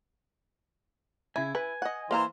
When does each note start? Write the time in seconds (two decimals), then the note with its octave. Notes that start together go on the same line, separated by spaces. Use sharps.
1.36 C#3 E4 G#5
1.55 B4 G#5
1.82 D#5 F#5
2.11 E3 A#3 C5 F5 A#5